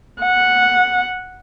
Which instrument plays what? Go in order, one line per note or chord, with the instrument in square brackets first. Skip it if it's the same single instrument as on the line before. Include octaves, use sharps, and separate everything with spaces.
[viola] F#5